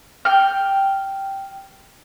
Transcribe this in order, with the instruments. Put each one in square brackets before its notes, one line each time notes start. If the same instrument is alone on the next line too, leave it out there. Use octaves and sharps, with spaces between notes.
[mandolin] G5 F6